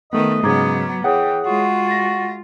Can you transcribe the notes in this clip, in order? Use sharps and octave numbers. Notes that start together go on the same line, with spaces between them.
D#3 A3 B3 B4 D#5
G#2 C#3 F#3 B3 A#5 D6 G#6
E3 G#4 C#5 F#5 G5 D#6
G#3 F4 F#4
A6 A#6